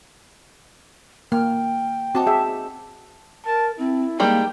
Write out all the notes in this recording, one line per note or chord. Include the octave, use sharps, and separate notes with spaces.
A#3 G5 F6
C4 D#4 F#4 A5 D6
G#4 E5
A#4 A5
C4 E4
D#3 G3 G#3 A#3 G5